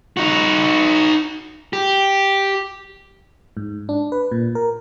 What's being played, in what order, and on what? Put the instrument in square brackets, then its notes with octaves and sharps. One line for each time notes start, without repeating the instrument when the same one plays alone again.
[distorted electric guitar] D#4 F#4
G4
[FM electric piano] G#2
D4
B4
A#2
A#4